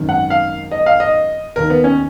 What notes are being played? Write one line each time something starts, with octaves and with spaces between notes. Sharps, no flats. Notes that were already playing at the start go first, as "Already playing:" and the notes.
Already playing: G#1 F#2 D#3
F#5
F5
D#5
F5
D#5
D#2 D#3 A#4
B3
C#4